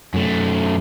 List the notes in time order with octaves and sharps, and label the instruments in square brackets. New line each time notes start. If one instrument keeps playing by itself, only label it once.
[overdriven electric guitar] F#2 A3